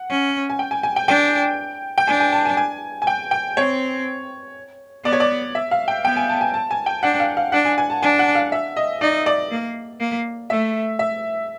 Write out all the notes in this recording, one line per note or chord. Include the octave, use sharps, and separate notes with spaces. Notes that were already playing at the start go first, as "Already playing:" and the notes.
Already playing: F#5
C#4
G#5
G5
G#5
G#5
G5
D4 G5
G5
D4 G#5
G#5
A5
G#5
G#5
G#5
G5
G5
C4 C#5
B3 D5
C#5
D5
E5
F5
G5
B3 G5
G#5
A5
G#5
A5
G#5
G5
D4 F#5
F5
F5
D4 F#5
G#5
G#5
A5
D4 G#5
F#5
F5
E5
D#5
D#4 D5
D5
A#3
A#3
A3 E5
E5